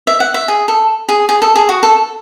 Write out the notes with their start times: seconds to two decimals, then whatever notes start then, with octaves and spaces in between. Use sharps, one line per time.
0.07 E5
0.20 F#5
0.34 E5
0.48 G#4
0.68 A4
1.09 G#4
1.29 G#4
1.42 A4
1.56 G#4
1.69 F#4
1.83 A4